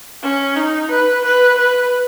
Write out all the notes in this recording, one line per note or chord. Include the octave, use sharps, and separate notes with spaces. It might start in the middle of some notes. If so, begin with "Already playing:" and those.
C#4
D#4
B4
B4
B4